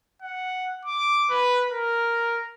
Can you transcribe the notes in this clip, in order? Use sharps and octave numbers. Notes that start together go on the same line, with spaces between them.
F#5
D6
B4
A#4